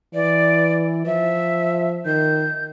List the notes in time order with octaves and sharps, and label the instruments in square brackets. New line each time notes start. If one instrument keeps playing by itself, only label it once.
[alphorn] E3 [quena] D5
[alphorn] F3 [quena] E5
[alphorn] D#3 [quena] G6